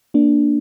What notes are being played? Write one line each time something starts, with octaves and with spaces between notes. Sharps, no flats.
A#3 D4